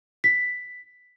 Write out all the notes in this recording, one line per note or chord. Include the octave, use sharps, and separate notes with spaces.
B6